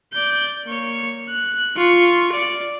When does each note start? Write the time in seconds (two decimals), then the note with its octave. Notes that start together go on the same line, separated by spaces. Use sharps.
0.14 D5 G6
0.66 A#3 C#5
1.29 F#6
1.76 F4 C#6
2.33 D5